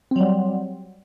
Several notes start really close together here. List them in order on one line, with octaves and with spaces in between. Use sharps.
C4 F#3 G3